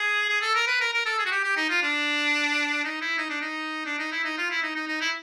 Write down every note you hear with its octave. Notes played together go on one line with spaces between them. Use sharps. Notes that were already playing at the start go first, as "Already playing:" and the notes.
Already playing: G#4
G#4
A4
A#4
B4
A#4
A#4
A4
G#4
F#4
G4
G4
D#4
F4
D4
D#4
E4
D#4
D4
D#4
D4
D#4
E4
D#4
F4
E4
D#4
D#4
D#4
E4